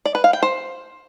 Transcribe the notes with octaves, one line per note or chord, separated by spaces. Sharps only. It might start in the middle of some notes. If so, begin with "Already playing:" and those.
D5
B4
F5
G5
C5